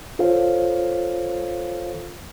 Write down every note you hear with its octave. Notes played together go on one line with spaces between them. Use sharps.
F4 A4 C5 C#5 F5